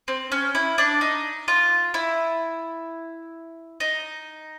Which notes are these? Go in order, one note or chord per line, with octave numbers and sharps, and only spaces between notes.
C4
C#4
E4
D4
D#4
F4
E4
D#4